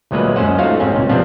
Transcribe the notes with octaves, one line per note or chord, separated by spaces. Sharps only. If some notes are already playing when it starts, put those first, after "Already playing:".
D2 A#2 F#3 G#3 A#3 B4
F#2 G#3 C#4 C5 F#5
A3 D#4 F4 F#4 F5
G#2 C4 C#4
C#2 A#2
C3 F3 G3 B3 C4 D4